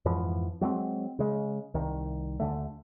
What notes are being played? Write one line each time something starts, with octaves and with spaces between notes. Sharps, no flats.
F2 G#2 E3 F3
F#3 G#3 B3 C4
C#3 G#3
C2 D#3
D2 D3 A3